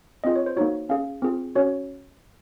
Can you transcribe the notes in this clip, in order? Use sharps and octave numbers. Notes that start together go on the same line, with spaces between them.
C4 F4 G#4 D#5
C#5
C5
A#3 D#4 F#4 C#5
C#4 G#4 F5
C4 F4 G#4
C#4 F#4 C#5